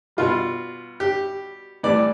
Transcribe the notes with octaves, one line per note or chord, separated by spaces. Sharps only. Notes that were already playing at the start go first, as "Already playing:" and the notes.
B2 G3 F4
G4
A2 E3 G3 D5